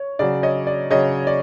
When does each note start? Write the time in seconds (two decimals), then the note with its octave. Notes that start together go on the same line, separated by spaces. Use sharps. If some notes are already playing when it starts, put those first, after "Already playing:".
Already playing: C#5
0.19 C#3 F#3 D5
0.43 C#5 D#5
0.67 D5
0.90 C#3 F#3 C#5 D#5
1.27 D5